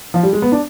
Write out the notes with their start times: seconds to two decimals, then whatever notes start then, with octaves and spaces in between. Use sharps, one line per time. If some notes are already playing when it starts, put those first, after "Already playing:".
0.14 F3
0.23 G3
0.33 G#3
0.42 B3
0.52 D4